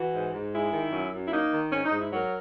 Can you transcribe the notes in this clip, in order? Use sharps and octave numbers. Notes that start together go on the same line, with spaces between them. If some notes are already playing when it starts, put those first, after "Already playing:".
Already playing: E3 F#4
G#2
G#2
G#3 E4
D#3
F#2
F#2
E4
A#3 D#4
D#3
G#2 C#4
D#4
G#2
E4
F#3 A#4